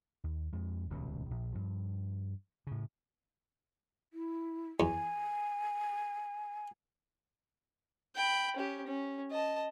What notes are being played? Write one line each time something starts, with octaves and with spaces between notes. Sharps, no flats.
D#2
F2 G#3
D#1 C#2 B2
A#1
G2 F3
A2 C#3
E4
E2 G#5
G5 B5
C#4 G4
C#4
D#5 A5